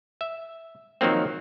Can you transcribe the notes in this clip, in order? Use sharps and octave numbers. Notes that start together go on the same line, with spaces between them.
E5
D#3 F3 F#3 A#3 C4